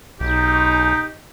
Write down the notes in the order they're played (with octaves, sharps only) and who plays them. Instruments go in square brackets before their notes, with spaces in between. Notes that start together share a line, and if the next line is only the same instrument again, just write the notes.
[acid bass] B1 [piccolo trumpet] D#4 [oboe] G4